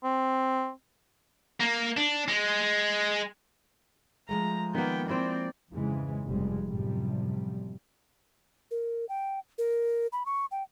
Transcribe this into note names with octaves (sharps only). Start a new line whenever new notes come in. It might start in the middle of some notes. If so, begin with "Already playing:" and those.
C4
A#3
D4
G#3
F3 G#3 A3 A#5
D#3 A#3 B3 G5
C4 E4 C5 D5 G5
F2 G#2 C#3 E3 G#3
F1 G2 G3 G#3
F#2 A2 C3 F3 G3
A#4
G5
A#4
B5
C#6
G5